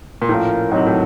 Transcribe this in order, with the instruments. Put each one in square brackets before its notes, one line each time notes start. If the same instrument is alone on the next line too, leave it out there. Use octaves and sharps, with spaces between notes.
[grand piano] A#2
[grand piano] A2 [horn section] F3 A#3 C#4 F4 A#4
[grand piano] G#2 [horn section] C3 D#3 F#3
[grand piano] A2